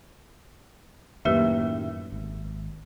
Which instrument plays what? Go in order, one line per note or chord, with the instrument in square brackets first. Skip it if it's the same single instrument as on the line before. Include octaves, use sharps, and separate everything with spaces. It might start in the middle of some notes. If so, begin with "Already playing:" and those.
[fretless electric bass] F#2 A2 D#3 [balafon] A#3 G4 B4 [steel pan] E5
[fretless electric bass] G#1